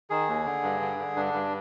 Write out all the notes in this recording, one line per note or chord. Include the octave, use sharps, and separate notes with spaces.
D#3 G#4
D#2
D3
G2
D3
D3
G2 D4
G2